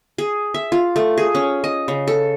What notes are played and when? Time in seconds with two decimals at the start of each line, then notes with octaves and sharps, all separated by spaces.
0.18 G#4
0.54 E5
0.72 F4
0.96 A3
1.18 G#4
1.35 C#4
1.64 D#5
1.88 C#3
2.07 A4